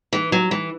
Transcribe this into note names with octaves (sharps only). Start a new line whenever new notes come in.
E3
F#3
E3